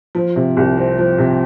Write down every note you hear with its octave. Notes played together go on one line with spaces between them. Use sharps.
F3 F4
C3
C2
C4
F3
C3